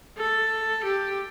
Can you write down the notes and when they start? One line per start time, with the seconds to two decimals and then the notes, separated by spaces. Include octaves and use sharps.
0.18 A4
0.84 G4